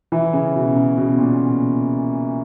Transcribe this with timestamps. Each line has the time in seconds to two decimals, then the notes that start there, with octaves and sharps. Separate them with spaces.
0.12 E3
0.33 C#3
0.55 B2
0.76 C#3
0.97 B2
1.18 A#2